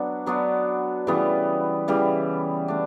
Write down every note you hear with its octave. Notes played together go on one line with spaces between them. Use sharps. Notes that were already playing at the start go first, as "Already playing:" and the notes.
Already playing: F#3 B3 D4 F#4
F#3 B3 D4 F#4
C#3 E3 G3 B3
C#3 E3 G3 B3
A3 D4